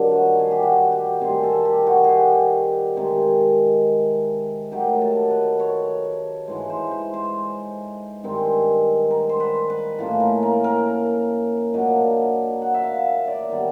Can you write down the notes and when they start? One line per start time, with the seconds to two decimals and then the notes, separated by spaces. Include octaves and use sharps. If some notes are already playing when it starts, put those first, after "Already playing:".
Already playing: G2 D#3 F#3 D4
0.11 F#4
0.40 G#4
0.51 G4
0.63 F#4
0.92 G4
1.21 C3 D#3 G3 C4 G#4
1.43 A4
1.65 G4
1.87 F#4
2.04 G4 G#4
2.97 C3 D#3 G#3
4.72 D#3 F#3 A3 G4
5.01 A4
5.30 B4
5.60 C#5
6.48 G#2 E3 G#3
6.70 C5
6.91 C5
7.14 C5
8.23 G2 D#3 G#3 C4
9.11 A#4
9.29 C5
9.40 B4
9.70 B4
9.98 A2 F3 A#3 C#4 A4
10.20 A#4
10.43 A#4
10.64 A#4
11.74 A#2 F#3 A#3 D4 D#5
12.62 F#5
12.74 E5
12.84 F5
13.05 E5
13.27 D5
13.49 D#3 G3 B3